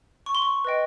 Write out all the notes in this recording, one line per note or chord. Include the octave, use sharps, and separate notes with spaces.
C#6
C6
C#6
B4 D#5 G5